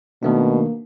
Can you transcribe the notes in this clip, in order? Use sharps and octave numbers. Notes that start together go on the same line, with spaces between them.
B2 D#3 A3 A#3 D4